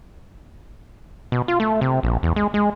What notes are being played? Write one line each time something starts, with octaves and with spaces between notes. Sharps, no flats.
B2
F4
A3
C3
A#1
E2
G#3
G#3